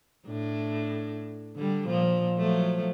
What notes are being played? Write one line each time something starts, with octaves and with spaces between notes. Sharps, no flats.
A2 D4
D3 G3
A#2 F3
F3 F#3 A3